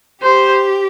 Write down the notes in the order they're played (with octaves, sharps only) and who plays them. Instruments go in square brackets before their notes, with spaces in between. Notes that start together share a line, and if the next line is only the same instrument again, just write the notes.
[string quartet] G4 [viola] C5